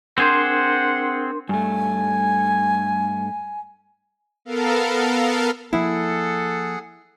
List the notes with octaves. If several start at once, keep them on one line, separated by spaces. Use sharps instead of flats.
C4 D4 G#4 A#4 C5 F#5 C6
G2 A3 G#5
B3 A4 A#4 F5
F3 A#3 E4 G#4 A4 F#5